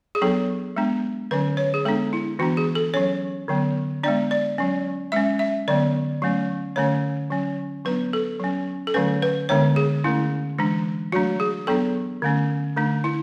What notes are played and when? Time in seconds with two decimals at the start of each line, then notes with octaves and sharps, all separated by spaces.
0.15 G#4
0.22 F#3 B3 D4 A4
0.76 G#3 B3 D4
1.31 D3 F#3 C#4 B4
1.57 C#5
1.74 G#4
1.85 G#3 B3 D4 A4
2.13 E4
2.39 E3 B3 D4 F#4
2.57 G#4
2.75 A4
2.94 F#3 C#4 C#5
3.48 D3 F#3 B3
4.03 G#3 B3 D4 D5
4.31 D5
4.58 F#3 C#4
5.12 G#3 C#4 E5
5.39 E5
5.68 D3 F#3 B3 D5
6.22 F#3 A3 C#4
6.76 D3 A3 C#4 C#5
7.30 F#3 C#4
7.85 F#3 B3 D4 B4
8.13 A4
8.40 F#3 C#4
8.87 A4
8.94 D3 F#3 A3 C#4 B4
9.22 B4
9.49 D3 G#3 B3 D4 C#5
9.76 G#4
10.04 D3 A3 C#4 E4
10.59 E3 G#3 D4
11.12 F#3 A3 D4 F#4
11.40 G#4
11.67 F#3 B3 D4 A4
12.22 D3 A3 C#4
12.76 D3 A3 D4
13.04 E4